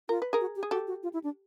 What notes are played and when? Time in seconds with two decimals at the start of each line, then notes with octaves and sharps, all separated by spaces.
0.09 F4 A#4
0.22 B4
0.33 G#4 A#4
0.41 F#4
0.56 G4
0.63 G#4
0.71 F#4 G4 A4
0.87 F#4
1.03 F4
1.13 E4
1.24 D4